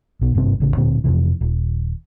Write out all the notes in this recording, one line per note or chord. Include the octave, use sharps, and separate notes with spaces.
B1 B2
G#1 G2 C3 C4
A1 C#3
D1 A#2 D3 C4
F2 G#2 C3 E3
D#1